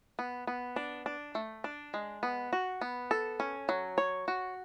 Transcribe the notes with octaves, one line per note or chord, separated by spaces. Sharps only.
B3
B3
D4
D4
A3
D4
G#3
B3
F#4
B3
A4
C#4
F#3
C#5
F#4